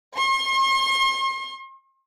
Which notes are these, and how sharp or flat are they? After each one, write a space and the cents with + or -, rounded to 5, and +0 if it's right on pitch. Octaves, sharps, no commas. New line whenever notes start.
C6 +45